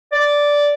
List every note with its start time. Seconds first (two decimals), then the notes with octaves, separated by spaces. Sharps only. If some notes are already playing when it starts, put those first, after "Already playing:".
0.12 D5